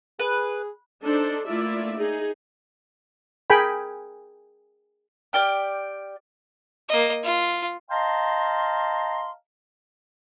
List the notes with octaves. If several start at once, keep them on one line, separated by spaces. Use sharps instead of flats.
G#4 B4
D4 D#4 A4 C5
A3 A#3 E4 F4 D5 E5
D#4 G#4
G#4 A#4 G5 G#5 B5
G4 D5 G5 F6
A#3 D#5
F4
D#5 F5 G5 A5 A#5 C6